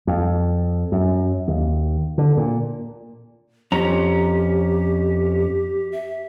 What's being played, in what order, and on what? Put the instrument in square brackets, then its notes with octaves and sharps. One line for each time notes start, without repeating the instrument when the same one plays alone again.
[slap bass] F2
F#2
D#2
D3
A#2
[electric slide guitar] F2 C#4 A#5 [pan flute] G4
[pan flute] E5